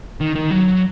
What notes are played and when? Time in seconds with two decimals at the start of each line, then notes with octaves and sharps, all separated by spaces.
0.21 D#3
0.35 D#3
0.51 F#3